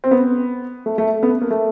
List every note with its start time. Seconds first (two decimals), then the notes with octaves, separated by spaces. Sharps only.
0.04 C4
0.11 B3
0.86 A3
0.98 A3
1.23 B3
1.41 A#3
1.51 A3